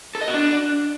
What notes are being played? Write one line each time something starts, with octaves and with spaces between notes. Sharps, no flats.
A4
D#5
F#4
D4